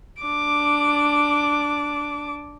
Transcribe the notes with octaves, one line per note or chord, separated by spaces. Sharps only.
D4 D6